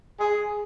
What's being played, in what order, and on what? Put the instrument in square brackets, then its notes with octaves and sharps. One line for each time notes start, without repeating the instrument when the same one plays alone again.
[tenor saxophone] G#4